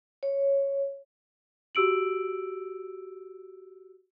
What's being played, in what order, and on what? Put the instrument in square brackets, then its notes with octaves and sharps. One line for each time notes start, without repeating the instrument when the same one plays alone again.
[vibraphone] C#5
[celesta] F#4 G4 E6 D7 F#7